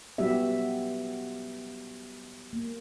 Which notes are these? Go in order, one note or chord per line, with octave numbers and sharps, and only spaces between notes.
F#3 G3 B3 F#4 G4 E5
A#3